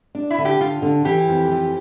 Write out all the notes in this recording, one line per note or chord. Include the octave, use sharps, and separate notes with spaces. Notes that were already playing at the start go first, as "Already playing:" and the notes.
D4
E4
D3
G4
D3 F4
D3
E3 G4
F2
E3